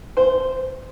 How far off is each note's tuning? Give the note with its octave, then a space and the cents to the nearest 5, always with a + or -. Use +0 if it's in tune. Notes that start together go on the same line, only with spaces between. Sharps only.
C5 -10